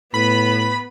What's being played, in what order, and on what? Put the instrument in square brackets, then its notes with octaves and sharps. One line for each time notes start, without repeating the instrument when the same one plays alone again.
[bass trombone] A2 [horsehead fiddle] B3 B4 [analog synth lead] B5